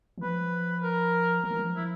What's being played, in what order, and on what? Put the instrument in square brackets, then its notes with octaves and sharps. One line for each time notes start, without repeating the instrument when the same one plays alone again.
[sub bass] E3
[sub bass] F3 [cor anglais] B4
[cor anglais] A#4
[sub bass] F3 [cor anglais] A#4
[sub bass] E3
F3
[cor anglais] E4